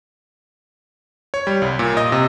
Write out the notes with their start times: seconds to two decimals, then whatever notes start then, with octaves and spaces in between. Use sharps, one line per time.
1.34 C#5
1.47 G3
1.62 C2
1.79 A#2
1.97 D#5
2.12 C3